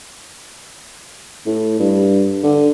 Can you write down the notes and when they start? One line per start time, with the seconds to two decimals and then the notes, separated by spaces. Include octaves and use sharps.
1.46 A2
1.79 G2
2.44 D3